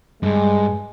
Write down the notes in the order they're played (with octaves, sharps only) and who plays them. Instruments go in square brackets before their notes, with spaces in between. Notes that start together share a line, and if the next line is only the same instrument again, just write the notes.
[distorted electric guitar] G2 [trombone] G#3